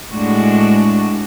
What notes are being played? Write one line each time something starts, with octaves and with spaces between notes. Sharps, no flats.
A2 G#3 D4 F#4